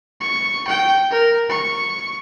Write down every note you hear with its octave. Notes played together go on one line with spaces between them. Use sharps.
C#6
G5
A#4
C#6